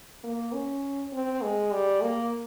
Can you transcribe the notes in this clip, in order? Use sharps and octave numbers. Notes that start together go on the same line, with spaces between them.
A#3
C#4
C4
G#3
G3
A#3